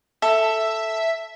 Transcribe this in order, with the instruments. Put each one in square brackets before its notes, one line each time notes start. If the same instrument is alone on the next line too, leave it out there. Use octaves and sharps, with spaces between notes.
[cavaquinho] A4 [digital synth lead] E5